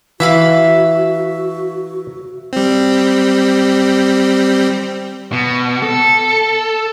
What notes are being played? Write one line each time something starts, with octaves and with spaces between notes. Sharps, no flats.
E3 F#4 E5 F5 B5
G3 C4
B2
A4